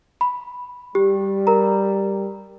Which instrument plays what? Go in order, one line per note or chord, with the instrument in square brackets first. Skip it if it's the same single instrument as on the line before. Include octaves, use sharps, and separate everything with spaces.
[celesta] B5
[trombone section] G3 [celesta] G4
[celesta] A#4 A#5